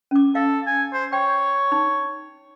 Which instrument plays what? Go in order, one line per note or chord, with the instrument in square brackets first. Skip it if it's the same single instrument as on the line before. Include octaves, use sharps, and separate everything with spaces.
[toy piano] C#4 D6
[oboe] A4 [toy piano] F5
[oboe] G#5
C5
[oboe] C#5 [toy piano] G5
[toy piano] D#4